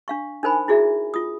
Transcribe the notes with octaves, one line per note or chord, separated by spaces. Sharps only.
D4 F5 C#6
D4 D#4 A#4 C5 G#5 B5
E4 F#4 G#4 D5 E5
F4 D#6